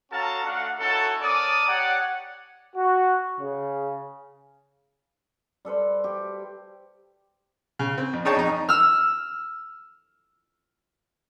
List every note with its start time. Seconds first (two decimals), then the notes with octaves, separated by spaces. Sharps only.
0.12 C#4 F#4 A4 F5 A5 A#5
0.45 A3 D4 F#4 F5 F#5
0.80 C#4 D#4 E4 F#4 A4
1.23 C#4 A#4 D5 A5 D6 D#6
1.68 G4 C#5 D5 F#5
2.75 F#4
3.39 C#3
5.65 G3 A4 B4 C5
6.04 G4
7.79 C#3
7.98 C4
8.13 F2
8.25 D4 D#4 G#4 C#5 G5 A5
8.36 F2 D#4
8.69 E6 F6